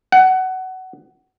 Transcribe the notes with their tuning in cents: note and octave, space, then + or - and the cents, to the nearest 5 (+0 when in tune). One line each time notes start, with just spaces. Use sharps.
F#5 +20